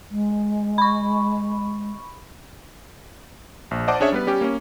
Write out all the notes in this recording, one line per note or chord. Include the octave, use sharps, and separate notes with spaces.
G#3
B5 C#6
A#1
C5 D5 D#5 F#5 A5 D6
C#4 D4 G#4 C#5 E5
G3 B3 B4
G3 C#4 G4
A#3 C#4